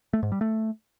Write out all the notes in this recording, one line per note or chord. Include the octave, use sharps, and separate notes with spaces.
A3
G#2
G3
A3